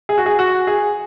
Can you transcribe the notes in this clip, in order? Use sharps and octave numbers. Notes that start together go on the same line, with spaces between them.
G#4
F#4
G#4
F#4
G#4